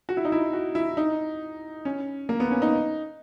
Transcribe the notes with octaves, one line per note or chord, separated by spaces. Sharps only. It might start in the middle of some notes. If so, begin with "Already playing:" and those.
F#4
E4
D#4
E4
F#4
E4
D#4
C#4
A#3
B3
C#4
D#4